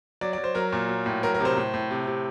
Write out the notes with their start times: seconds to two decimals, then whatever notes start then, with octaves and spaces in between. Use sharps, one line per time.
0.21 F#3 D5
0.33 D5
0.38 F#3
0.44 C5
0.55 F#3 A#4
0.72 A#2
0.89 F#3
1.06 A2
1.23 F#3 A#4
1.34 A#4
1.40 C3 C5
1.57 A2
1.74 A2
1.91 C3
2.07 C3